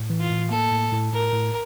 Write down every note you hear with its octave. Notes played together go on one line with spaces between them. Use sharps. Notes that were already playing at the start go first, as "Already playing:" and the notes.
Already playing: A2
E3
F4
A2
A#3 A4
A2
A2
A2 A#4
A2